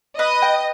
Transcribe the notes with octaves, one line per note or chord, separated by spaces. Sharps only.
B4 D#5
G5